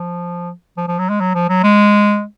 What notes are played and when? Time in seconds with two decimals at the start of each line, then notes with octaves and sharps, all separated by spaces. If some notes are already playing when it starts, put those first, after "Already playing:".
Already playing: F3
0.77 F3
0.88 F3
0.99 F#3
1.09 G#3
1.20 F#3
1.35 F3
1.49 F#3
1.63 G#3